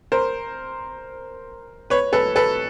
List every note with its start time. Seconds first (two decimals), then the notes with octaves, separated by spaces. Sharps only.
0.12 A#4 C5
1.90 B4 C#5
2.13 A4 B4
2.36 A4 B4